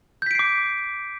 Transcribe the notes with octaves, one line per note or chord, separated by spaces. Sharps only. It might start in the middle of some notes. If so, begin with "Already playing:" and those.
D6 G6 B6 C7 D7